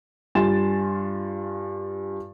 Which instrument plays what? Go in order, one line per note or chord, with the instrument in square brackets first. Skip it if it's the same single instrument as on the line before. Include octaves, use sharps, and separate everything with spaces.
[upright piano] G2 F4 G#5 C6 A6 E7